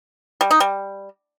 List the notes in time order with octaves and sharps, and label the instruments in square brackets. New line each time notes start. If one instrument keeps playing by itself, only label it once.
[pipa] G3
D#4
G3